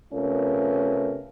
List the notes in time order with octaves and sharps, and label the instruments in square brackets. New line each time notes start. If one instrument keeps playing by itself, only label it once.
[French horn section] C3 A3 C#4 F4 A#4 B4